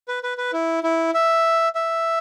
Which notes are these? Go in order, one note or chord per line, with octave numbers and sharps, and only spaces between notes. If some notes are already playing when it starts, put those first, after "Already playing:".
B4
B4
B4
E4
E4
E5
E5